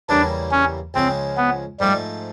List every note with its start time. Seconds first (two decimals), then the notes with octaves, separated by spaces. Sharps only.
0.09 E2 C#3 E3 G3 A#3 D4
0.52 C#4
0.94 C#2 C#3 F3 G#3 C4
1.37 B3
1.80 G#2 F3 G3 A3